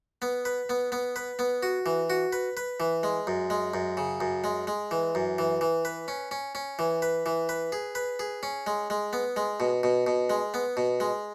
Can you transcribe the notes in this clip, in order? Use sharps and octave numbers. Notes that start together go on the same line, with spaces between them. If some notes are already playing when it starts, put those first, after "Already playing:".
B3
B4
B3
B3
B4
B3
F#4
E3
F#4
B4
B4
E3
G#3
F#2
G#3
F#2
C#3
F#2
G#3
G#3
E3
F#2
E3
E3
B4
C#4
C#4
C#4
E3
B4
E3
B4
G#4
B4
G#4
C#4
G#3
G#3
B3
G#3
B2
B2
B2
G#3
B3
B2
G#3